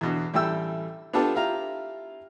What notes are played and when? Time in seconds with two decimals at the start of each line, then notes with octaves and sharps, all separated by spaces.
0.01 E2 B2 D3
0.34 A1 G3 E4 A4 G5 E6
1.13 B3 D4 F4 G4 A4 A5
1.35 E4 F4 G4 F5 A#5